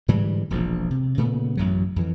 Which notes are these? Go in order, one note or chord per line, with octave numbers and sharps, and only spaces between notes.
G#2 D3 E3 G3
E1 A#1 F3
C3
A#2 C#3 A3 B3
A1 F#2 F#3
F2 E3